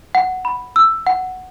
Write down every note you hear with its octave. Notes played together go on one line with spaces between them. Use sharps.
F#5
B5
E6
F#5